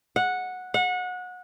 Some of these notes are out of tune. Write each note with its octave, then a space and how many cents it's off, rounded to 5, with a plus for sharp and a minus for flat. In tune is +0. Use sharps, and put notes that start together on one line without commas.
F#5 -10
F#5 -25